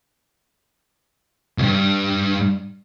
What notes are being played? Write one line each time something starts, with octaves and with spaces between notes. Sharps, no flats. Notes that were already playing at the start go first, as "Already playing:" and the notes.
C2 G2